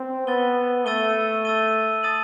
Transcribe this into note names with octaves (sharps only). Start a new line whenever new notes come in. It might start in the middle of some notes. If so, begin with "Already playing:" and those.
Already playing: C4
B3 E6 A6 D#7 G7
A3 E6 A6 D#7 G7
E6 A6 D#7 G7
A5 D#6 A6 D#7 F#7